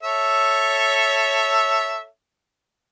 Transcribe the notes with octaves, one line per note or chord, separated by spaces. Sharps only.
A4 C#5 E5